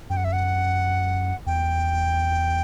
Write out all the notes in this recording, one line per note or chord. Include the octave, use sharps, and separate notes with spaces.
F#2 G5
F#5
E5
F#5
E2 G5